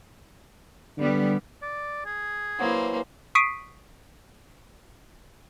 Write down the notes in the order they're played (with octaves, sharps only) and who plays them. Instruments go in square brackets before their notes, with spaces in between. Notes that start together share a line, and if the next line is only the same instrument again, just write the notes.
[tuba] D3 [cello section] G3 B3
[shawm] D5
G#4
[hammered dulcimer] E3 F#3 [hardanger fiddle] A#3 C5
[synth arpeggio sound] C#6 D#6 B6 C7 D7 D#7